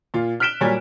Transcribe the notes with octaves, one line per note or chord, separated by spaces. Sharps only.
A#2 F4
F6 F#6 B6 D7 E7 G7
A#2 F#3 G3 C#5 G#5